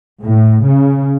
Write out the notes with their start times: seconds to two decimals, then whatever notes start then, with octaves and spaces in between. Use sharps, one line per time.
0.23 A2
0.64 C#3